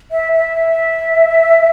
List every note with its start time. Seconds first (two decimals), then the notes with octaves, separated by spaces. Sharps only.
0.11 E5
0.33 E5